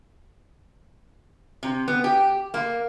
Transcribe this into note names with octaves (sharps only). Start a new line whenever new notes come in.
C3
B3
G4
A#3